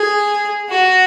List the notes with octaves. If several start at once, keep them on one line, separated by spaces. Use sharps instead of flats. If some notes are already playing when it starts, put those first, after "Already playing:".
Already playing: G#4
F#4